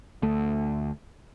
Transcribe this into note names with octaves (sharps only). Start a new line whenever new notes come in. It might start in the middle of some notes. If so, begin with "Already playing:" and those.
D2 A3